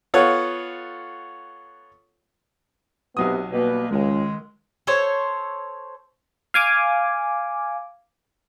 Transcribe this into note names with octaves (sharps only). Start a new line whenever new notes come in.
B3 F4 A4 C#5 F#5
B1 C3 F#3 B3 D#6
B2 G3 A#3 B4
C#2 D#3 G#3
A4 C5 C#5
F5 G#5 D6